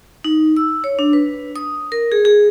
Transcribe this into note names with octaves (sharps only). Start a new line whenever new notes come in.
D#4
E6
C#5
D4
B4
D#6
A#4
G#4
G#4